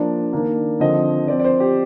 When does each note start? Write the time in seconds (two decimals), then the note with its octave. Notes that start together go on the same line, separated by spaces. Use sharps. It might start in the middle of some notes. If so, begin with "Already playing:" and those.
Already playing: F3 A#3 D4 D5
0.32 D#3 A#3 D4
0.80 D3 F3 C4 D#5
1.28 F3 C4 D5
1.39 D5
1.44 C5
1.60 G4